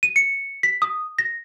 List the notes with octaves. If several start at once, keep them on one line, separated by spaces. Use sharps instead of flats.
D#7
C#7
B6
D#6
A#6